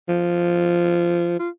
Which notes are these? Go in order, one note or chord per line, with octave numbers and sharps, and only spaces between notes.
F3
F4